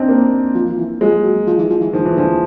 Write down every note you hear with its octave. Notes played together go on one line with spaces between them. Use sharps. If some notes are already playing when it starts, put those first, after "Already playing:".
Already playing: C4 D4 D#4
A#3
F3
F3
E3
F3 G#3
F#3
F3
E3
F3
E3
D#3 F3
E3
D3 F3